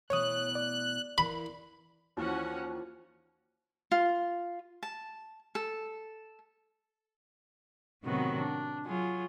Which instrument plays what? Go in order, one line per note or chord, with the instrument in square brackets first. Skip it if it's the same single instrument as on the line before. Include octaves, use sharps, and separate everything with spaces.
[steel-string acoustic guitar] B2 E3 A3 [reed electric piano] C#5 D#6 [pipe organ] F#6
[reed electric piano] D5
[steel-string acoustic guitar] E3 A#3 [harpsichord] B5
[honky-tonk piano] D#2 E3 [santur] F3 F4 [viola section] C#4 F#4 F#5
[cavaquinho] F4
A5
A4
[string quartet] A2 C3 D#3 F#3 B3 F#4
D4
F#3 F4 G#4